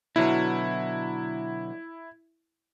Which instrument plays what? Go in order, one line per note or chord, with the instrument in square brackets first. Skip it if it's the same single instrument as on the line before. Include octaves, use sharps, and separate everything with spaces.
[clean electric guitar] B2 D3 F#3 [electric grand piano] E4